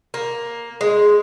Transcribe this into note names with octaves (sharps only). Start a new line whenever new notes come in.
A#3
G#3